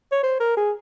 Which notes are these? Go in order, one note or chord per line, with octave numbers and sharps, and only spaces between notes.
C#5
C5
A#4
G#4